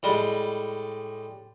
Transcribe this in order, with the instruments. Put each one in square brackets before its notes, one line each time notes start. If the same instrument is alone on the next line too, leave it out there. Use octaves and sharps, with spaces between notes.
[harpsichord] A2 G3 G#3